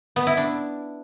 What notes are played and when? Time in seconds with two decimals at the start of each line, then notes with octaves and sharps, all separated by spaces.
0.16 B3
0.27 E4
0.37 D4